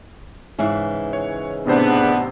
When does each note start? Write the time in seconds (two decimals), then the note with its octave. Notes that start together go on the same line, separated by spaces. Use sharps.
0.58 G#2 C#3 E3
1.13 C#5
1.67 A1 C3 B3 D4 C5